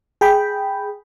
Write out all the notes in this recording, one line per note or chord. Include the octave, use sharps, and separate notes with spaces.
G#4 G5 B5